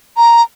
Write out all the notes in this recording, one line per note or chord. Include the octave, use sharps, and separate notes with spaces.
A#5